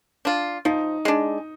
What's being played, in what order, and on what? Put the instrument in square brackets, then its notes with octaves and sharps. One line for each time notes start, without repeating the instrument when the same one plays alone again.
[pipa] D4 F4
[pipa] F3 [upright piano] D#4
[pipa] G#3 D4